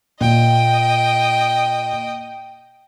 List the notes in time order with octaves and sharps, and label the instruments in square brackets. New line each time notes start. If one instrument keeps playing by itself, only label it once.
[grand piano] A#2 [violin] D#5 G5